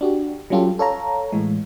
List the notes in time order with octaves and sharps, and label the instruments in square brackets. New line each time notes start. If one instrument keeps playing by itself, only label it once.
[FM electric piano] D4 F#4 G4
F#3 G3 C#4 F4 G4 A4
A4 C#5 F5 A#5
A2 E3 G#3